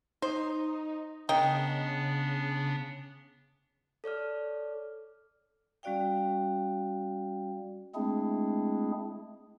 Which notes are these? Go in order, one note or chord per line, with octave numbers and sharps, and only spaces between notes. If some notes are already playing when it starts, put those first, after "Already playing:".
D#4 C5
C#3 B3 D4 A#4 D#5 G5
A4 C#5 D5 F6
G3 C#4 F#4 D5 F5 G5
G#3 A3 C4 D4 E4 G#4